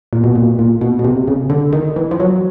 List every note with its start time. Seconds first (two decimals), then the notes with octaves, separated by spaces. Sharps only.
0.13 A#2
0.24 B2
0.35 A#2
0.59 A#2
0.81 B2
0.99 B2
1.04 C3
1.28 C#3
1.50 D3
1.73 D#3
1.96 E3
2.11 F3
2.20 F#3